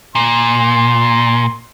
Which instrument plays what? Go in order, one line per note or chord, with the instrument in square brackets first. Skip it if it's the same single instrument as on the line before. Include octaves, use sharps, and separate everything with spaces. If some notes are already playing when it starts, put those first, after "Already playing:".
[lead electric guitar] A#2 [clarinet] C6